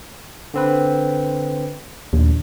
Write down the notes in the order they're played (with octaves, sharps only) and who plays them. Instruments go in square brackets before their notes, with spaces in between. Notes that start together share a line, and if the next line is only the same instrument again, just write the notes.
[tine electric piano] D3 C4 B4
[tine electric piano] A#1 [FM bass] D#2